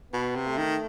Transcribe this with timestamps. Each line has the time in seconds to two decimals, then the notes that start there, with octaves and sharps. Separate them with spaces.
0.13 B2 B3
0.35 C3
0.47 A3
0.58 D#3